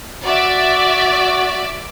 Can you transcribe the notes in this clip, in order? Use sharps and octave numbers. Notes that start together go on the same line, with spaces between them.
F#4 D5 E5